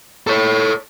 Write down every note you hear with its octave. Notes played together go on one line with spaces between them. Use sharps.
A4 C#5